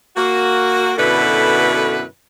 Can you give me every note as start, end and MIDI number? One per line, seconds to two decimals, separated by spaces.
0.17 0.93 58
0.17 0.93 66
0.98 2.03 42
0.98 2.03 47
0.98 2.03 50
0.98 2.03 64
0.98 2.03 69
0.98 2.03 71